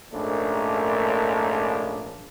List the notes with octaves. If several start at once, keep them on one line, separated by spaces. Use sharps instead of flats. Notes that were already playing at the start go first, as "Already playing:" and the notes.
A#1 G#2 A3 A#3 C#4 D4